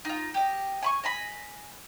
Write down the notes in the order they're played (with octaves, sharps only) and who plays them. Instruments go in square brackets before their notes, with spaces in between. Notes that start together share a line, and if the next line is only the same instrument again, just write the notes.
[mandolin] D#4 F4
G4 D#5
G#5 B5 C#6
D#5 G#5 B5